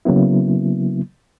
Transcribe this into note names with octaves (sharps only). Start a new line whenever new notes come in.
C#3 F#3 A#3 B3 E4